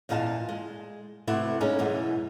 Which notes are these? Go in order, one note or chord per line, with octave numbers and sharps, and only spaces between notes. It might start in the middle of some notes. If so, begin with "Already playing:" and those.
E2 A#2 D#5 F5 G#5 A5
G#3
C3 A3 B3 E4 F#4 C5
G#3 A#3 C#4 D#4 G#4
F#2 B2 E3 G#3